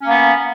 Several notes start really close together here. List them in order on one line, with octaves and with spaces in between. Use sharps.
C#4 A#3 B3